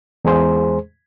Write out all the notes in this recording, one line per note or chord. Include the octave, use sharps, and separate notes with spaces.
E2 G#3 G#4 C5